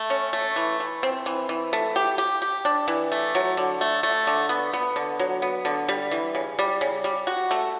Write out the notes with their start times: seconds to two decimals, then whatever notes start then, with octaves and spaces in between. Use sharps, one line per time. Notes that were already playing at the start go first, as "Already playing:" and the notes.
Already playing: A3
0.10 C#4
0.33 A3
0.56 E3
0.80 E3
1.03 C4
1.26 E3
1.49 E3
1.73 A3
1.96 G4
2.18 G4
2.42 G4
2.65 D4
2.88 E3
3.12 A3
3.35 F#3
3.57 D3
3.81 A3
4.03 A3
4.27 D3
4.49 B3
4.73 B3
4.96 D3
5.19 F#3
5.42 B3
5.65 D3
5.88 G3
6.11 E3
6.35 C#3
6.59 G3
6.81 C#3
7.04 G3
7.27 F#4
7.51 A3